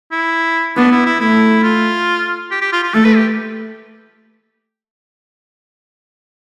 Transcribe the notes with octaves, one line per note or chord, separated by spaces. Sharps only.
E4
B3 D4
E4
E4
A3 E4
F4
G4
G4
F4
F4
A3 A4
B4
G4